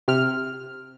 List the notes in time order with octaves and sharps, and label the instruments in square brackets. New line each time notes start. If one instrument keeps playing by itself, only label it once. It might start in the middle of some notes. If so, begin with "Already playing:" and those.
[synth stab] C3 F6